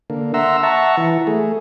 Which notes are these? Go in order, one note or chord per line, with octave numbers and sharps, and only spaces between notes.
D3 A#3
E5 F#5 A#5 C6 E6
E5 F#5 A5 A#5 C#6
E3
A3 G#4